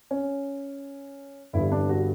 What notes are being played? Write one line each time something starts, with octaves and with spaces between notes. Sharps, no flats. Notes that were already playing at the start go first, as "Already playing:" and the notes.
C#4
G1 G2 E3 G3 E4
D4
F#4